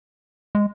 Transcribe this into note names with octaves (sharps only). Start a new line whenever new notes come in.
G#3